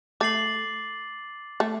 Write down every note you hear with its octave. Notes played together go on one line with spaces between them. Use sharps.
A3 D6 A6 C7 F#7
A3